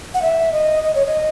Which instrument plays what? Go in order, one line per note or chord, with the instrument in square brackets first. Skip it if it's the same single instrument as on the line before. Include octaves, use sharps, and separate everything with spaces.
[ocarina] F#5
E5
D#5
D#5
C#5
D#5